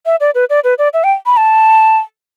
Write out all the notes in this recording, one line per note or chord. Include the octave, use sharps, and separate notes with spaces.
E5
D5
B4
D5
B4
D5
E5
G5
B5
A5